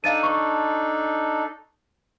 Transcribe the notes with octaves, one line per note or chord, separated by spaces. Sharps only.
D4 D#4 A4 F5 A6 D#7
C#6